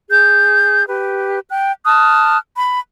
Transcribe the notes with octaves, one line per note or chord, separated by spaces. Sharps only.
G#4 G6
G4 B4
G5 F#6
A5 D#6 F6 F#6
B5